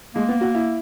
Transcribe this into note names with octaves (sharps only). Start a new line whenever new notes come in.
G#3 A#3
B3
F#4
E4